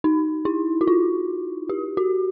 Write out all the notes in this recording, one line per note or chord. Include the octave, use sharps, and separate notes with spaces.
D#4
E4
F#4
F4
G4
F#4